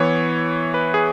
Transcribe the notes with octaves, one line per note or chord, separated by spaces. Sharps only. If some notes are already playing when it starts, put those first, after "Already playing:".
Already playing: E3 B3 E4 C#5
B4
G#4